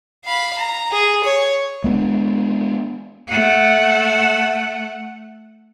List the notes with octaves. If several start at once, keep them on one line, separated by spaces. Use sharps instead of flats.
F5 B5
A#5
G#4
C#5
G#3 B3 C#4 D4
A3 F#5